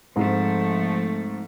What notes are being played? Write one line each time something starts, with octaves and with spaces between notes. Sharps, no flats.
G#2 F3 A3 C4